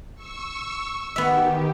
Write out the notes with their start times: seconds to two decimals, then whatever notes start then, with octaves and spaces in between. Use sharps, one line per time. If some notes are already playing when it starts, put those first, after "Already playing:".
0.15 C#6 E6
1.16 D#3 B3 G4 E5